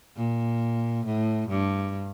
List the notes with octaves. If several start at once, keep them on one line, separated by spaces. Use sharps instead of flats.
A#2
A2
G2